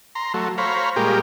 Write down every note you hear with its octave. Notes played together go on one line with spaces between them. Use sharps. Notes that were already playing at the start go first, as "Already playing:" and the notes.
A#5 C6
F#3 A3
C5 C#5 F5 A#5 B5
A#2 G3 G#3 G4 A#4